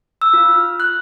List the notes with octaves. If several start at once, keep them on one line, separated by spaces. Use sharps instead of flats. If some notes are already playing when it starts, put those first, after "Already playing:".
E6
F4
F6
F#6